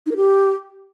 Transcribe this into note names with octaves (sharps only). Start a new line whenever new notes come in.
D#4
A#4
G4